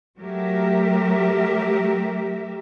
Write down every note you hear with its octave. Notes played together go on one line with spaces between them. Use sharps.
F#3 A3 G4 A#4 E5